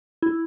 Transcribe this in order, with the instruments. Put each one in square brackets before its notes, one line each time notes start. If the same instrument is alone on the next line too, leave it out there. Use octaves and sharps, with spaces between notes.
[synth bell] E4